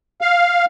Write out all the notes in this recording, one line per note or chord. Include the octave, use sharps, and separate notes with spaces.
F5